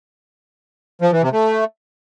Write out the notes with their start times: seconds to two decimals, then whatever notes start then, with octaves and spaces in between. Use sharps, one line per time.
1.02 F3
1.12 E3
1.22 C3
1.32 A3